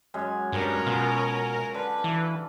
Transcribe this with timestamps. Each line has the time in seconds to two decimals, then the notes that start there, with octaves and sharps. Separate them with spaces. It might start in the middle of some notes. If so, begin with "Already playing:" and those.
0.14 F#2 G#3 G#5
0.52 G2 C#4 A#4
0.86 B2 F4
1.74 D3 B4
2.04 E3